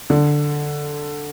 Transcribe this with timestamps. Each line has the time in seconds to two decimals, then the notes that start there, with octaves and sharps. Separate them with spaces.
0.10 D3